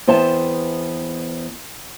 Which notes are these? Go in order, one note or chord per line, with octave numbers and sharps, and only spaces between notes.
E2 B3 C4 C5 E5 A5